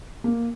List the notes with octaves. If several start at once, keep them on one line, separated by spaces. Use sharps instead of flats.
A#3